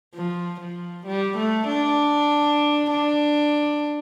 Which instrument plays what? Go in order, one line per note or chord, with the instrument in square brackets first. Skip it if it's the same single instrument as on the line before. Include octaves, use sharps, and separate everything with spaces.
[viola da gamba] F3
F3
G3
A3
D4
D4